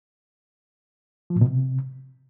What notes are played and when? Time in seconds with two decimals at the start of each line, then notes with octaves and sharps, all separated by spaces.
1.30 F3
1.36 A2
1.41 B2
1.47 C3